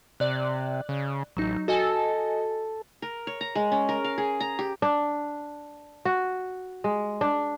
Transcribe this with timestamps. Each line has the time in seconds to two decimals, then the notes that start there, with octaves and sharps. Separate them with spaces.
0.20 C3 D5 F#6
0.89 C#3
1.37 A1 F#3 D#4
1.68 F#4 A4 D#5 G#5
3.02 A#4
3.27 C#5
3.41 A#5
3.55 G#3
3.72 C#4
3.89 A#4
4.04 F5
4.18 G#4
4.40 A#5
4.59 G4
4.82 D4
6.05 F#4
6.84 G#3
7.21 D4